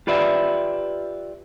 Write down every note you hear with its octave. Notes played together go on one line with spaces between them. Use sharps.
F4 G4 B4 D5 E5